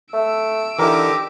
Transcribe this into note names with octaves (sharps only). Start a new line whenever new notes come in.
A3 E6 D7
D3 E3 D#4 G4 A#4 D6